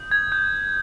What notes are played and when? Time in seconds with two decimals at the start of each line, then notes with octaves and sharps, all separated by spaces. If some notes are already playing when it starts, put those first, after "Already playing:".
Already playing: D#6 G6
0.11 G#6
0.32 G6